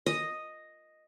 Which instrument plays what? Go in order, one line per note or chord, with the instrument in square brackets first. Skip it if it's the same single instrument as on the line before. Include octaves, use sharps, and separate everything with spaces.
[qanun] D#5